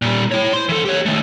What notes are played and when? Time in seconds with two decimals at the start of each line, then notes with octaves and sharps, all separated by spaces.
0.02 A#2 G3
0.32 E4 C#5
0.53 C5 C6
0.69 E3 A4
0.85 G4 C#5
1.06 D#3 A3